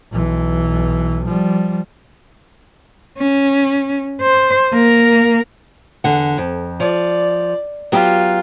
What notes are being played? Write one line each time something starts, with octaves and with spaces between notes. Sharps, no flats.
B1 E3
F3 G3
C#4
C5
A#3 A#4
E2 D3 F#5
F2
F3 D5
F#3 B3 F4 G4